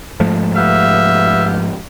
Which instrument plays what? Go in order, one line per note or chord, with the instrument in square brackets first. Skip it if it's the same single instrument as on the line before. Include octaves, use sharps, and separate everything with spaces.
[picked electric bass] G#2 F3 A3
[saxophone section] B3 G4 F5 [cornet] E5